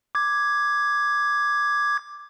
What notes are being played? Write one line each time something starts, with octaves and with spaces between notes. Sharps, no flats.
D6 G#6